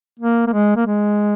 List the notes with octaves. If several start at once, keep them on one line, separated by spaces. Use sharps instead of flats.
A#3
A#3
G#3
A#3
G#3